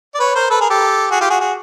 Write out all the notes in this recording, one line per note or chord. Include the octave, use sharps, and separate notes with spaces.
D5
B4 C#5
A#4 C5
A4 B4
G#4 A#4
G4 A4
F#4 G#4
F4 G4
F#4 G#4
F#4 G#4